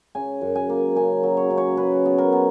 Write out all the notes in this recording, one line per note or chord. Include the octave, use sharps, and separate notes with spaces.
C#3 G#5
F#2
G#5
A#3
C#3 G#5
F#3
C#5
C#3
C#5
C#3 B4
B3
A#4
B3